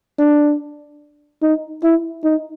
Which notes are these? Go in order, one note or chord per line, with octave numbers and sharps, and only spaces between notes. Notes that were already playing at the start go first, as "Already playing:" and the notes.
D4
D#4
E4
D#4